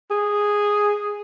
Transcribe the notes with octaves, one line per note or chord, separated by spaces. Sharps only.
G#4